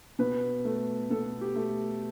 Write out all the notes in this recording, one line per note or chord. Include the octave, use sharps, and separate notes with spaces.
B2 B4
A3
B2 A4
G4
A3